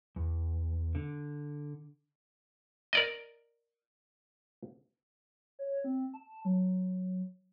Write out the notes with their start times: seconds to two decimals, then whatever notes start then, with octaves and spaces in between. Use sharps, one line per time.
0.16 E2
0.95 D3
2.93 A#4 D5 D#5
5.59 C#5
5.84 C4
6.14 A5
6.45 F#3